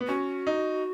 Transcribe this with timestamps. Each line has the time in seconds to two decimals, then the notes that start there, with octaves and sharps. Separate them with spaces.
0.01 B3
0.08 C#4 F#4
0.47 D#4